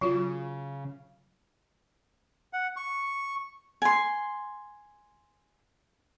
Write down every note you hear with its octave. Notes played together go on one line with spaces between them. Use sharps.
C#3 F#3 F4 F#4
F#5
C#6
G#5 C6